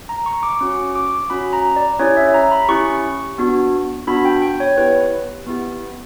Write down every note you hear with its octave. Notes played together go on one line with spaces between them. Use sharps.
A#5
C#6
D6
D6
C#4 F#4 C#6
D6
C#4 F#4 B5
A#5
D5
C#4 E4 G4 C#5
E5
A#5
B5
C#4 E4 G4 C#6
B3 D4 F#4
B3 D4 F#4 B5
G5
G5
C#5
B3 E4 G4 B4
B3 E4 G4